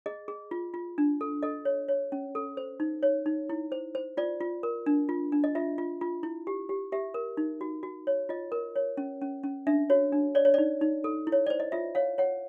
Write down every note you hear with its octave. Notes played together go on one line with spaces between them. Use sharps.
G#4 D#5
G#4
F4
F4
D4
A4
A4 D#5
C#5
C#5
C#4
A4
C5
D#4
C#5
D#4
E4
C5
C5
F4 D5
F4
A#4
D4
F4
D4
D#5
F4 E5
F4
F4
E4
G4
G4
G4 E5
A#4
D#4
F#4
F#4
C#5
F4 D#5
A#4
C#5
C#4
C#4
C#4
D4 E5
F#4 C#5
D4
C#5 D5
C#5
D#4 D5
D#4
A4
E4
C#5
C5 D5
D#5
F4 E5
C#5 F5
C#5 F#5